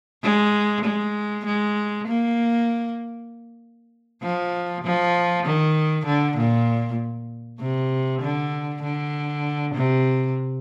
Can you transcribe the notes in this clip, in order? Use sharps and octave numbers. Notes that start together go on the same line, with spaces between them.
G#3
G#3
G#3
A#3
F3
F3
D#3
D3
A#2
C3
D3
D3
C3